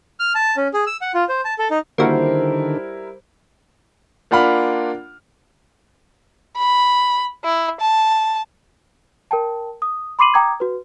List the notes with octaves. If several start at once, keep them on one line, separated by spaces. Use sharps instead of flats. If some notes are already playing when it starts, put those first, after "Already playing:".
F6
A5
C#4
G#4
E6
F#5
F4
C5
A5
A4
D#4
D3 D#3 G3 A#3 E4 F#4 A#4 C5
A#3 D4 F4 F#5 B5 F6
B5
E4
A5
A#4 G5 A5
D#6
B5 C6 D6 C7 D#7 F#7
G5 A#5 D6 D#6 G#6
F#4 B4